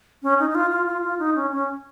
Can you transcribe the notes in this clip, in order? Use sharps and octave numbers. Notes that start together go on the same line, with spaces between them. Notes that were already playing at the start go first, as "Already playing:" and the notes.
C#4
D#4
D#4
F4
F4
F4
F4
D#4
C#4
C#4